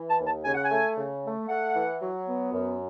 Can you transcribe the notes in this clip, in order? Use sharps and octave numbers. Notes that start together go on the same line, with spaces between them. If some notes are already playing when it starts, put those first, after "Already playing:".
Already playing: E3
A5
D#2
A5
C#3 G#5
F#5
G#5
A3
C#3
A3
A3 F#5
E3
F#3
B3
F#2